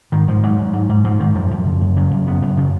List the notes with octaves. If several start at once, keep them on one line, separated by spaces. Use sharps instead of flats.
G#2 D#3
G#2 F3
G#2 F#3
G#2
G#2
G#2
G#2 F3
G#2 D#3
F#2 F3
F#2
C#3
F#2
C#3 F#3
F#2
C#3 B3
F#2
C#3